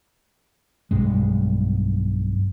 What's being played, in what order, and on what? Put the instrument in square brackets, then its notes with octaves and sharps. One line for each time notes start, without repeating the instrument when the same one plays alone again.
[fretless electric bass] B1 G2 G#3